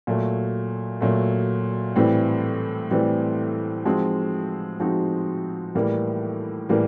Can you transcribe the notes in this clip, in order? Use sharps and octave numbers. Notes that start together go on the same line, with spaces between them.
A#2 F#3 A3
A#2 F#3 A3
A2 E3 G3 C4
A2 E3 G3 C4
F3 G#3 C4 D#4 F#4
F3 G#3 C4 D#4 F#4
A2 E3 G3 A#3
A2 E3 G3 A#3